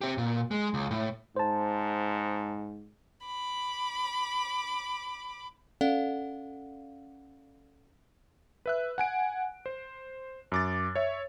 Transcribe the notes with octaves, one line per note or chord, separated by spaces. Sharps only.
C4 G4
A#2
G#3
C#2
A2
G#2 C5 A5
B5 D6
C#4 A4 D5 F5 F#5
B4 E5 F#6
F#5 G#5 D7
C5
F#2 D6 A6
C#5 E5